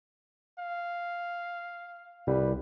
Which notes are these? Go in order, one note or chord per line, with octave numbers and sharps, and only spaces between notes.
F5
C2 G3 B4